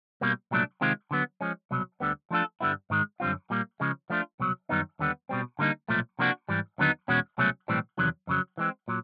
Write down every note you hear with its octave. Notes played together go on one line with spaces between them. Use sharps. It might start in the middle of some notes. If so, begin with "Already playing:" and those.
B2 G3 A#3
C2 A#2 F#3 A3 D4
C3 D#3 G#3 C4 F4
D3 F#3 B3
F3 G#3 C#4
C2 B2 F#3
D2 D3 G3 B3
F3 A3 D4 F4 A4
G2 D3 G3 B3 E4
G#2 D#3 G#3
F#2 D3 G3 C4 F4
A#2 G3 A#3
C#3 F3 G#3
F3 A3 D4 F4
C2 B2 F#3
F#2 D#3 G3 B3 D#4
D#2 D3 G3 B3
B2 G3 C4
D3 G3 A#3 D#4
B1 A#2 F3 A3
C3 F3 A#3 D4 F#4
G#2 E3 G3
D#2 D3 F#3 B3 D#4
E2 B2 G#3 C#4 F#4
C2 B2 F#3 A3 C#4
B1 A2 E3 G3 C4
E2 C3 D#3 F#3
F2 C#3 F#3
E3 G#3 C4
A#2 F#3